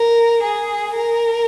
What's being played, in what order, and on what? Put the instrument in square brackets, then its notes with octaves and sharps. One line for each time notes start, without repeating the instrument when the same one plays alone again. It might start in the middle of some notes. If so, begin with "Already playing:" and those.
Already playing: [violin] A#4
G#4
A#4